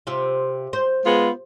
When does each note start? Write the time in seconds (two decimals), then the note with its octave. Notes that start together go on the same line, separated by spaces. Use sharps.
0.07 C3 F4
0.73 C5
1.05 G#3 B3 F4